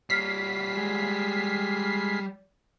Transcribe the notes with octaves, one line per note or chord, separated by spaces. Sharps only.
G3 C#5 F6 B6 C7
G#3